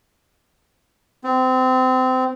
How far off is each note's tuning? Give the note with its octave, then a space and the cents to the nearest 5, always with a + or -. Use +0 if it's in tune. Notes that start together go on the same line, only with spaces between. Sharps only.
C4 -25